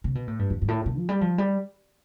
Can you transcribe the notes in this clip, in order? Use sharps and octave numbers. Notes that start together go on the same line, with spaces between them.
C3
B2
A2
G2
F2
G2
A2
B2
F3
G3
F3
G3